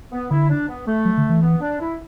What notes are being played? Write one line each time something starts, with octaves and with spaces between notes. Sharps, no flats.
B3
D3 E4
D4
B3
A3
F#3
D3
E3
B3
D4
E4